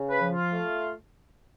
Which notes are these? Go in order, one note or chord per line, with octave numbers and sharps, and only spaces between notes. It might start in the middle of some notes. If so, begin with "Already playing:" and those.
Already playing: C#3
B4
F3
F4
A3